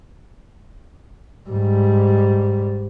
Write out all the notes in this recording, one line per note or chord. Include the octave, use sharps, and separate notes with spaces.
G#2 G3